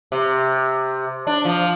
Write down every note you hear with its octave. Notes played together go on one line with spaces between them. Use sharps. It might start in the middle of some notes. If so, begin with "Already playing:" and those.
C3
D4
F3